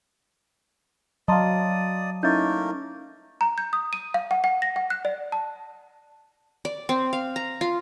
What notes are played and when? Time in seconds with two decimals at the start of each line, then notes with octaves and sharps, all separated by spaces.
1.28 F#3 D5 D#5 F5 A5 A#5 C6 D#6
2.23 A3 A#3 C#4 D#4 E4 A#4 G6 A6
3.41 A#5
3.58 G6
3.73 D#6
3.93 D#7
4.14 F5
4.31 F#5
4.44 F#5
4.62 A#6
4.76 F#5
4.90 F#6
5.05 D5
5.32 A5
6.65 D5
6.89 C4
7.13 F5
7.36 A#5
7.61 F4